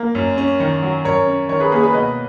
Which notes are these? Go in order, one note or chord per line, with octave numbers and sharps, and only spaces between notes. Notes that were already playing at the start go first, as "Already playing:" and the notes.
Already playing: A#3
F#2
C#4
D#3
F#3
F#2 A#4 C#5
C#4
D#3 A#4 C#5
G#4 B4
A#3 G#4 B4
G#4 B4
B2 B4 D#5